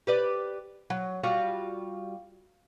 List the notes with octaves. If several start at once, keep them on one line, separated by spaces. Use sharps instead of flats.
G4 B4 D5
F#3
G3 F4 F#4